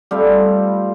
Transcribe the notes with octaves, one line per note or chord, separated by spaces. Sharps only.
G3 A3 C4 F4